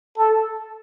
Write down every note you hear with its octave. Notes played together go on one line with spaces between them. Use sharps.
A4